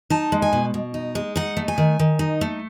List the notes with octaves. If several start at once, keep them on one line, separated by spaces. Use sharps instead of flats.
D#4 A5
G#3
G#5
B2
B2
D#4
G#3
D#4 F#5
A3
G#5
D#3
D#3
D#4
A3